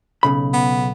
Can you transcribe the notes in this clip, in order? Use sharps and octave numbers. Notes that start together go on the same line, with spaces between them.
B1 C#3 B5
B3